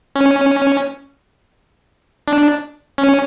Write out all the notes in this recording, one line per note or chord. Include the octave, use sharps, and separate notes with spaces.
C#4
D4
C#4